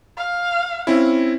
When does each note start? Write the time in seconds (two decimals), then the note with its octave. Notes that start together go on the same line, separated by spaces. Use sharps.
0.17 F5
0.87 C4 C#4 E4